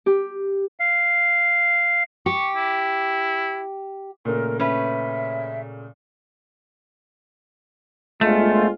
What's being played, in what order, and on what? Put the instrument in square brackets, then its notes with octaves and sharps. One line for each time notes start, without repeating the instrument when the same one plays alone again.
[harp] G4
[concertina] F5
[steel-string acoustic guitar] G4 [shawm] C#6
[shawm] E4
[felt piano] A#2 C#3 A3 [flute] A#4
[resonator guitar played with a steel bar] C#4 B4 [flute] E5
[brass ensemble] G1 G#3 F4 [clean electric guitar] A3